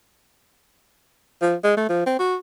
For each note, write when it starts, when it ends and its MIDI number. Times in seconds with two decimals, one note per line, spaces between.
1.42 1.55 53
1.64 1.75 56
1.77 1.85 57
1.89 2.05 53
2.06 2.18 60
2.19 2.36 66